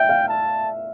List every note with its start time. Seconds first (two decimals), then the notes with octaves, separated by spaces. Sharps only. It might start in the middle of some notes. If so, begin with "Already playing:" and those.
Already playing: E5 G5
0.09 F5
0.29 A5